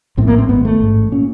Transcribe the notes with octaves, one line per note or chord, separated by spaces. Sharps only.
A#1 A2 C4
A#3
C4
G#1 G#2 B3
A3
A1 G#2
A#2 C#4